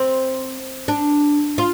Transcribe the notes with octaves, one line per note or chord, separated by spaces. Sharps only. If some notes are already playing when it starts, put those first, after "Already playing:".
Already playing: C4
D4
F4